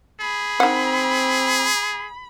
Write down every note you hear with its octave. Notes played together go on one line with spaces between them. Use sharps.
G#4 B5
D#3 C4 F#5